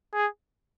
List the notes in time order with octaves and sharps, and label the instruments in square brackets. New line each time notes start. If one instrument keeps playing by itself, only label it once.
[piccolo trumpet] G#4